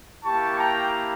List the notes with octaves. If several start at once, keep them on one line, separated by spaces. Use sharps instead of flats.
A#3 E4 G4 A5 C#6
G5 A#5